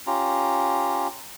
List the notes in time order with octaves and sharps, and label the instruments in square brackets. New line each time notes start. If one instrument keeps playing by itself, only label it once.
[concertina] C#4 F4 G4 A#5